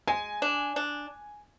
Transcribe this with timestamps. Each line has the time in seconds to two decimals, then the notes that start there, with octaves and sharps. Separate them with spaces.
0.07 G#3 G#5
0.42 D4
0.76 D4